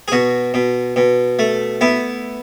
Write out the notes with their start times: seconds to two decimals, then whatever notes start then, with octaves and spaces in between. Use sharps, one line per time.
0.08 G#4
0.12 B2 F#4
0.54 B2
0.96 B2
1.39 A3
1.81 B3 E4